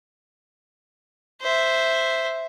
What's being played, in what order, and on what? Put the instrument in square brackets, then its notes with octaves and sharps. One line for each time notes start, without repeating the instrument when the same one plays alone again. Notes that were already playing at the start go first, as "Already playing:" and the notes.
[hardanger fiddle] C5 E5